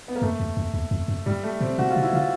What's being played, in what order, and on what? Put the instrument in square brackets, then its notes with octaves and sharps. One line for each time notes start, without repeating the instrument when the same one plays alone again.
[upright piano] B3
A#3
[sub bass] F#2 [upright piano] A3
[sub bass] F2
F2
E2
F2
F#2
[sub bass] G2 [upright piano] G3
[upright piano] A3
[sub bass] A#2 [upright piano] C4
[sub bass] B2 [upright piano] F#4
[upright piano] F4
[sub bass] C3
[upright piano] E4
[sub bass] C#3 [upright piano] F4